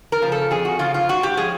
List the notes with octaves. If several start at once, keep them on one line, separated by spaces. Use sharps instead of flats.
A#4
C#3 F3
A4
F2 G#4
F#4
C#3 F3 F4
F4
G#2 F#4
G4
F3 G#3 C#4 G#4